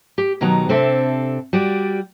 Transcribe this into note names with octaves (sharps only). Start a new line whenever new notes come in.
G4
B2 D#3 F#3 B3 A#5
C3 C4 D4 A4 C5 E5
G3 F#4 D5